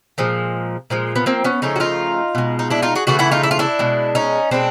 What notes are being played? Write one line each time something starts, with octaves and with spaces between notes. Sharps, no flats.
A#2 F3 G#3
A#2 F3 G#3
B3
A#3 C4
B3 C#4
C#3 F3 A3 C#4 D#4
F#4
D#4 F4
B2 G#3
D#4
D4 E4
D#4 F4
F#4 G#4
C#3 E3 A3 F#4 G#4
E4 F#4
D#4 F4
E4
F4
D4 E4
B2 G#3
C#4 D#4
B2 G#3 C4 D4